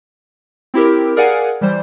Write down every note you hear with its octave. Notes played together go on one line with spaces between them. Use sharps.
C4 E4 G4 A#4
G#4 A#4 D5 F5 F#5 G#5
E3 G3 C5